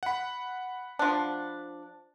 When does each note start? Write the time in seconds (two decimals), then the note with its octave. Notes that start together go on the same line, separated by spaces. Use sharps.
0.03 F#5 B5
0.99 F3 D4